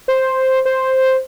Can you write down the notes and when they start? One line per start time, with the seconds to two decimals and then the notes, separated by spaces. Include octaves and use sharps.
0.08 C5
0.65 C5